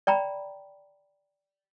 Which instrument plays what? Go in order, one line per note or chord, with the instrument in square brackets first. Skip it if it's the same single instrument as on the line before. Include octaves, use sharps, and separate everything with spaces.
[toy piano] D5 G5 A#5 B5